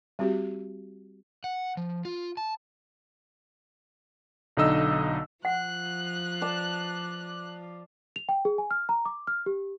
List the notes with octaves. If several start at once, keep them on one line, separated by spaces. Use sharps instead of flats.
G3 C4 F#4 G4
F#5
F3
F4
A5
B1 D3 D#4 D#5 E6
F3 F4 F#5 F#6
D5 A5
F7
G5
G#4
G#5
F6
A#5
D6
F6
G4